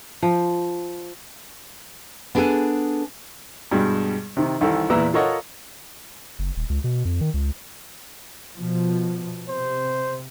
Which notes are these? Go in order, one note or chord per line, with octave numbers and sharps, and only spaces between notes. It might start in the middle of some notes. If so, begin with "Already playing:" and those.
F3
B3 D4 G#4 A4 G#5
G2 B2 G3 G#3
C3 D#3
C2 D#3 E3 A4
E2 A#2 E4 B4 A#5 E6
F4 A4 A#4 C#5 D#5 F#5
F#1
D#1
C#2
B2
F2
D#3
C#2
B2 F3
C3 C5